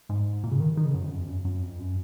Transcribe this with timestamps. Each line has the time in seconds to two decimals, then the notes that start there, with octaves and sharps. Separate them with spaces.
0.09 G#2
0.44 A#2
0.52 C#3
0.60 D#3
0.77 D#3
0.86 C#3
0.94 F#2
1.02 F2
1.11 F#2
1.19 F2
1.28 F#2
1.45 F#2
1.62 F2
1.79 F#2